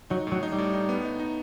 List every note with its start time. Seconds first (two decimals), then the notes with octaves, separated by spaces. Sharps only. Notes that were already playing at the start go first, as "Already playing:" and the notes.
0.10 F#3 D#4
0.27 A2
0.32 F#3
0.43 D#4
0.52 G3
0.58 A2
0.74 D#4
0.89 B3
1.05 D#4
1.20 D#4